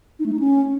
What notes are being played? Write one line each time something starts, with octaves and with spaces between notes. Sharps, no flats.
D#4
A3
D#4
C#4